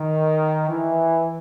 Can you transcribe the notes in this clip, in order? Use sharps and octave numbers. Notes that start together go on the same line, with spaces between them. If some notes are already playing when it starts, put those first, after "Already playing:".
Already playing: D#3
E3